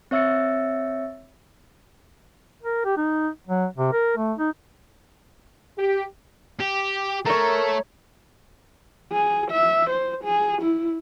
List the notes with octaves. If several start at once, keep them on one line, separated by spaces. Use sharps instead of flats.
C4 C#5 E5 E6 A6 C#7
A#4
G4
D#4
F#3
C3
A#4
A3
D#4
G4
G4
A3 A#4 C#5 A#5
G#4
E5
C5
G#4
E4